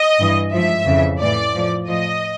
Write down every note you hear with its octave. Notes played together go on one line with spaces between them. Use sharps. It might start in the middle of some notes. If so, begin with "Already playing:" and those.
Already playing: D#5
G2 E3
G#2 F3 E5
F2 C#3 E3
A2 E3 D5
A2 F3
A2 F3 D#5